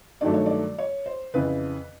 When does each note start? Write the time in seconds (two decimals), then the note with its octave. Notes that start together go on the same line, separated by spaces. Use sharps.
0.21 G2 D#3 F#3 A3 D5
0.34 C#5
0.46 D5
0.78 C#5
1.06 C5
1.34 F2 C#3 E3 B4